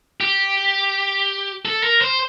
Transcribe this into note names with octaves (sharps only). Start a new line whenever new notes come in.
G4
A4
A#4
C5